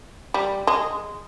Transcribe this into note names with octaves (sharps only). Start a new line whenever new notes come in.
G3
G#3